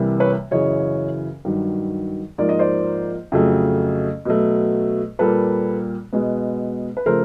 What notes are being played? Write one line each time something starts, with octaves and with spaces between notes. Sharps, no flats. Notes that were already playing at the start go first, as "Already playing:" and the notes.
Already playing: C2 C3 E3 G3 A#3
B4 C#5
F#2 C#3 E3 C#5 D#5
G2 D#3 F#3
G#2 F3 A#3 D5
D#5
C5 D5
F2 C#3 F#3 A3
B2 F#3 A3
A#2 G3 A#3 A4 B4
B2 G#3 B3
B4
C#3 F3 A3 A#4 C5